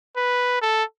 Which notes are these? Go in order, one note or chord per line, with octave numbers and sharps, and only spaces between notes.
B4
A4